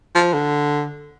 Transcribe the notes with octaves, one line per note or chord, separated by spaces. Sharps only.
F3
D3